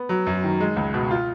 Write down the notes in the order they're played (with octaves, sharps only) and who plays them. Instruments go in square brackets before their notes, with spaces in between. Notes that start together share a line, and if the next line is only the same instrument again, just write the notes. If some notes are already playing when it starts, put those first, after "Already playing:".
Already playing: [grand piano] B3
F#3
F#2
D#3
G#3
C#2
B2
F4